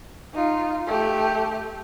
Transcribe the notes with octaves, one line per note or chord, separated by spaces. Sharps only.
D#4 F4
A3 G4